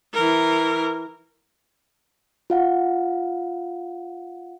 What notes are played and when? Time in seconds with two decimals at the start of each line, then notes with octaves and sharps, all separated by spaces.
0.13 E3 A#4
2.50 F4 F5 F#5